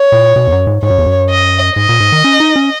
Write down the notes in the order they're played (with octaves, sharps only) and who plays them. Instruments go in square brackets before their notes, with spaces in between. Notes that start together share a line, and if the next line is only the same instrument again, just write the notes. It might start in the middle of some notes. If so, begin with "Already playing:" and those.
Already playing: [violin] C#5
[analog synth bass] A#2
B2
E2
F#2
G#2
[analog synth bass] G#2 [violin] C#5
[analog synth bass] F#2
E2
F#2
[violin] D#5
[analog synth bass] G#2 [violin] D#5
[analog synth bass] A#2
G#2
D#3
C#4
D#4
C#4